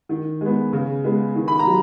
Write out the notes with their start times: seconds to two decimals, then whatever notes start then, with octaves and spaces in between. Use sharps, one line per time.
0.09 D#3
0.41 G#3 B3
0.73 C#3
1.04 G#3 B3
1.35 D#3
1.48 B5
1.59 A#5
1.67 F#3